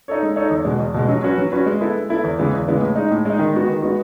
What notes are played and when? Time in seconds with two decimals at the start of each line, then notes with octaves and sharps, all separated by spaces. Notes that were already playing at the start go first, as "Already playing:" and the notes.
0.08 D#4 A4 C#5
0.23 G#3
0.36 D#4 A4 C#5
0.50 E2
0.65 B2 G#3
0.80 E2
0.94 B2 G#3
1.09 F#3
1.23 C#4 F#4 B4
1.38 F#3
1.52 C#4 F#4 B4
1.66 G#3
1.81 B3 E4 A4
1.96 G#3
2.09 B3 E4 A4
2.24 E2
2.39 C#3 E3 G#3 B3
2.53 E2
2.68 C#3 E3 G#3 B3
2.81 A2
2.96 G#3 D#4
3.11 A2
3.25 G#3 D#4
3.39 D#3
3.53 G#3 B3 F#4
3.68 D#3
3.82 G#3 B3 F#4